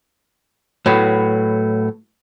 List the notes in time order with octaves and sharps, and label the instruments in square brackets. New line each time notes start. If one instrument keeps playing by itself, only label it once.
[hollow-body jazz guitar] A2 F#3 B3